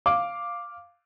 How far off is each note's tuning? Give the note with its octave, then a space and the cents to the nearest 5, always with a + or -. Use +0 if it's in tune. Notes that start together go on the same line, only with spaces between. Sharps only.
F5 +0 D6 +0